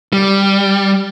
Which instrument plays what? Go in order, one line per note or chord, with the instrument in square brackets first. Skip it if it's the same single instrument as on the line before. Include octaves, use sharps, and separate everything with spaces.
[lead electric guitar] G3